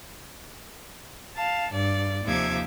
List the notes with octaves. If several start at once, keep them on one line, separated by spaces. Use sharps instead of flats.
F5 A5
G2 D5
D#2 C3 F3 E5 D6 G#6